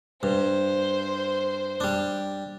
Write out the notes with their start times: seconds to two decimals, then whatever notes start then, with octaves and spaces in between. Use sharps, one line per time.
0.23 G2 C5
1.80 G3 D4